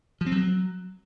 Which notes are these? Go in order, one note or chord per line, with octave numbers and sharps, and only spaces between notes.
F3
C4
F#3